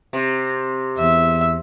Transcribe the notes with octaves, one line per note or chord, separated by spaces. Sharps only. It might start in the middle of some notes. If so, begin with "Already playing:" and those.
C3
E2 E5